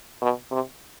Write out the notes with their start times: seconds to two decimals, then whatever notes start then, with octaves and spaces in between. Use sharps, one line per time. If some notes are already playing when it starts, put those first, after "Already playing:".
0.21 B2
0.51 C3